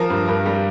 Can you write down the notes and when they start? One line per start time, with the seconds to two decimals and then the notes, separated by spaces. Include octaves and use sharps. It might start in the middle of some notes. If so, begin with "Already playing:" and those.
Already playing: F3 A#4
0.10 G2
0.28 G2 A#4
0.46 G3